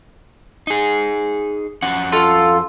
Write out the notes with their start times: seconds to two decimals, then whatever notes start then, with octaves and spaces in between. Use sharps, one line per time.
0.67 D#4 G#4
1.82 F2 C#4 F#5
2.12 F4 A4